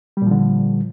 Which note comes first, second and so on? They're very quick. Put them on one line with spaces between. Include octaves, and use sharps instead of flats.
G3 A#2 F3 D3